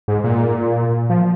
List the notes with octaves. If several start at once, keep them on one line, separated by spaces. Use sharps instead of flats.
G#2
A#2
F3